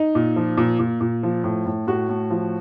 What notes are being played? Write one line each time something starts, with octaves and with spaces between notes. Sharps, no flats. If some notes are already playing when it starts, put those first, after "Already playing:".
Already playing: D#4
A#2
F3
A#2
A#2
A#2
F3
A2
A2
A2 F#4
A2
F3